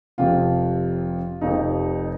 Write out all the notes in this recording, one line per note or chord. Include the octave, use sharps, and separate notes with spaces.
F1 F2 C3 F3 F4
F1 F2 C3 F3 D#4